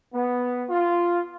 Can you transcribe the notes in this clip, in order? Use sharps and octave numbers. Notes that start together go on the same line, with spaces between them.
B3
F4